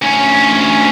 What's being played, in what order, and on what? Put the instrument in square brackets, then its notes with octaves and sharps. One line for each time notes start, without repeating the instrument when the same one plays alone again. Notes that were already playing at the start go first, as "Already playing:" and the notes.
[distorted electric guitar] D2 C#4